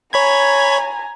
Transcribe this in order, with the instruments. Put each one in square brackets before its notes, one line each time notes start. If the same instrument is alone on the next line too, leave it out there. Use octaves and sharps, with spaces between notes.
[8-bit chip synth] C#5 B5 G#6 [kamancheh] G#5 A#5